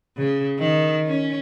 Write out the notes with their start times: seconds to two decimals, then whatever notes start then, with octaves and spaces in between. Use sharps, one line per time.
0.17 C#3
0.58 D#3
1.06 C#4